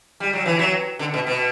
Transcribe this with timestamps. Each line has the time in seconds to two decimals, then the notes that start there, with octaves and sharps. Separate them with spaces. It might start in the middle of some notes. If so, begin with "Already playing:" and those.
0.20 G3
0.33 F#3
0.46 E3
0.59 F#3
0.99 D3
1.14 B2
1.27 B2